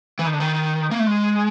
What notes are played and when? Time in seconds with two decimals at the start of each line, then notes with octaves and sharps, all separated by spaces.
0.19 E3
0.26 D#3
0.33 D3
0.40 D#3
0.91 A#3
0.99 A3
1.06 G#3